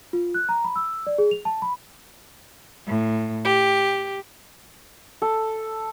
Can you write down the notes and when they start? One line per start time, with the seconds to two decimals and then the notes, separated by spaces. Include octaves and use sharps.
0.13 F4
0.34 F#6
0.49 A#5
0.64 B5
0.76 E6
1.07 D5
1.18 G#4
1.31 F7
1.45 A5
1.62 B5
2.86 A2
3.46 G4
5.22 A4